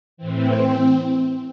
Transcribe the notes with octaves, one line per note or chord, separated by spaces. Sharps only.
A2 E3 C4